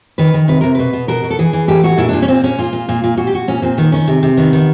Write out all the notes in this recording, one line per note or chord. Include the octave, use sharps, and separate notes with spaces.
D#3 B4
D#3
C3 B4
C3 A#4
B2 B4
B2
B2 A#4
B2
A4
E3 G#4
E3
A2 G4
A2 F#4
A#2 E4
A#2 D4
C#4
A#2 C4
A#2 C#4
A#2 F4
A#2
A#2
A#2
A#2 F#4
G4
A#2 F#4
A#2 C#4
A#2 C4
D#3 B3
D#3 C#4
C3
C3
D#3 B3
D#3